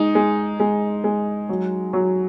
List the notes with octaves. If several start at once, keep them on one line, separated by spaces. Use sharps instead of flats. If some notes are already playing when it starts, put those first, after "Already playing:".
Already playing: G#3 D#4
G#3
G#3
G#3
F#3
F#3